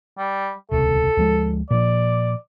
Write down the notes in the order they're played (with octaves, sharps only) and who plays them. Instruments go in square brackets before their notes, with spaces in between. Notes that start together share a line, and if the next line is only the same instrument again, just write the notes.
[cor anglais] G3
[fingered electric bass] D#1 C#2 C3 [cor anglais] A4
[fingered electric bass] D2 F3 G#3
[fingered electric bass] A#2 F3 [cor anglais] D5